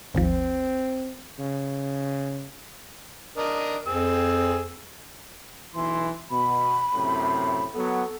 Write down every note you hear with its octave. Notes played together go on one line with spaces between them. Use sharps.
G#1 D#2 F3 C4
C#3
D4 A#4 D#5
F2 C4 G#4 E6
B1 E3 C6
B2 B5
F#2 A2 C3
F#3 B3 A4